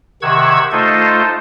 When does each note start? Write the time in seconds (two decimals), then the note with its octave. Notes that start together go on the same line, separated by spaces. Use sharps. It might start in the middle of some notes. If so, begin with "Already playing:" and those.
0.22 C3 D#3 F#5 C#6 E6 G#6
0.72 A3 D#4 F4 A4 C5 D#5